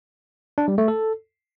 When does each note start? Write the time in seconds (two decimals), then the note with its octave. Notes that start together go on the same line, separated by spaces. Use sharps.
0.58 D4
0.68 G3
0.78 A3
0.88 A4